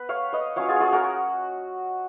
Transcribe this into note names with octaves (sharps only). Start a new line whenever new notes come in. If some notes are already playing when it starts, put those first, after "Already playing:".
Already playing: B3 B4
C#5 F5
B4 D#5
F#3 C#4 F4 C#5 F5
F4 G#4
F4 G#4
F#4 A#4